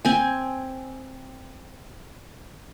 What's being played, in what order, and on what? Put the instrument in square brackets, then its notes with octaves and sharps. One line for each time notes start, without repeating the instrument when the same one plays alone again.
[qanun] C4 G#5